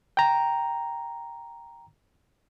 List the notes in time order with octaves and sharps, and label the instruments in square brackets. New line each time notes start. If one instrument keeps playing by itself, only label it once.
[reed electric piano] G5 A#5